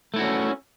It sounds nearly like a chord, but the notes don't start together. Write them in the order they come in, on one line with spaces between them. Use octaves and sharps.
A3 E4 F#4 D4 C#4